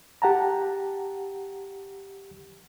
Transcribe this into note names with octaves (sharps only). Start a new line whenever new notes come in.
G4 F#5 A5 A#5